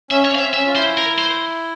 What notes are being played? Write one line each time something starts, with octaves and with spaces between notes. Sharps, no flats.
C#4 E5
C#4 C#5
C4 F5
E5
C4
C#4 E5
F4
E4 C5
A#4
C5